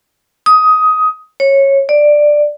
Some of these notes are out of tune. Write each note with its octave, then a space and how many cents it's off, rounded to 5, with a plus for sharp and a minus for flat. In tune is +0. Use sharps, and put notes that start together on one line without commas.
D#6 +15
C#5 -15
D5 +10